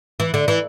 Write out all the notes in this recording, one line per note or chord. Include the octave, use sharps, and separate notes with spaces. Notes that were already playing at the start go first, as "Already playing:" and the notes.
E3
D3
E3